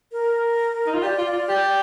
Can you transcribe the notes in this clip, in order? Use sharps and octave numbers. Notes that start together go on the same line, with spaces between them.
A#4
D#4
F4
G4 D5
F4
F4
G4